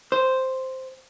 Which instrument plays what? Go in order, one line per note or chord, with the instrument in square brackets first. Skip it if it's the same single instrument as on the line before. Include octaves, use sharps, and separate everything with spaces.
[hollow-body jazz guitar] C5